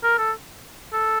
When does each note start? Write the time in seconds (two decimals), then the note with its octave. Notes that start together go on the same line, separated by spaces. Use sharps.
0.03 A#4
0.18 A4
0.93 A4